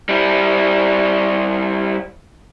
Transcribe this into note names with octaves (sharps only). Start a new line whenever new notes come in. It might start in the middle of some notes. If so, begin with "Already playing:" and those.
G3 E4